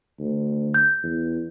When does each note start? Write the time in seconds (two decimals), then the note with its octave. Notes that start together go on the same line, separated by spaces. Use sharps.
0.20 D2
0.74 G6
1.03 E2